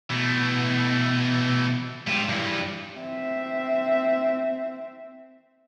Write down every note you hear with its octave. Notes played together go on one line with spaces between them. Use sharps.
B2 E3 A3
G#2 E4 F4 G4
G2 E3 G3
C4 E5